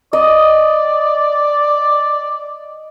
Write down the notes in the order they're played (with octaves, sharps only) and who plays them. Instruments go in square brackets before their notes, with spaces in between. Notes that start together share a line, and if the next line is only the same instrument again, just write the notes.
[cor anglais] D5 [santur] D#5